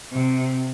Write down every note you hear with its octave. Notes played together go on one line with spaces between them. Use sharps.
C3